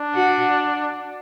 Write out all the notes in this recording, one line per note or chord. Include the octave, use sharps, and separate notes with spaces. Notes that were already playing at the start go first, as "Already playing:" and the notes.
Already playing: D4
F#4